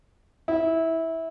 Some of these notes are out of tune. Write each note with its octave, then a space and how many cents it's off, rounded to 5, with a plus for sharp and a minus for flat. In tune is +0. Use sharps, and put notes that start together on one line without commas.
E4 -15